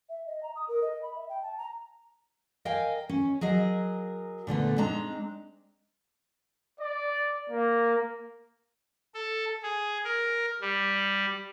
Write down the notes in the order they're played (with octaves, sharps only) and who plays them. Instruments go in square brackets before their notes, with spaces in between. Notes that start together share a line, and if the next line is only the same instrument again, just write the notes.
[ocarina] E5
D#5
A#5
D#6
A#4
D#5
B5
E5
G5
A5
A#5
[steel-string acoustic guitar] A#4 D#5 F5 G5 G#5
C#4
F#3 G#4 A#4 D#5
A#2 D3 A3 B3
G#3 C4 D4 D#4 A#5
[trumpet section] D5
A#3
[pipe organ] A4
G#4
A#4
G3